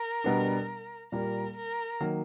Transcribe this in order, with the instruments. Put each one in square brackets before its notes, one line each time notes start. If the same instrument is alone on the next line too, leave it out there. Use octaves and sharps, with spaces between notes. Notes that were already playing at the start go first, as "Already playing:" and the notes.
Already playing: [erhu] A#4
[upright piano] B2 G3 B3 D4
[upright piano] A#2 G3 A#3 [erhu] A#4
[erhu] A#4
[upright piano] D#3 F#3 A#3